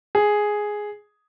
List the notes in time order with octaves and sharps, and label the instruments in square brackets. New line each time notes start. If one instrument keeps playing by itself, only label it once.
[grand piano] G#4